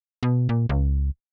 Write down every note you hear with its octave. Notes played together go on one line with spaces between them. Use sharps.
B2
A#2
C#2